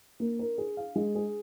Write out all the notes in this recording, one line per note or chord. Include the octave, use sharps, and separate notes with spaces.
A#3
A#4
G#4
F5
G#3
G#4